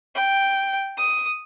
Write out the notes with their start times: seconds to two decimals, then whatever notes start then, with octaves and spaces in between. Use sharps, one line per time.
0.15 G5
0.97 D#6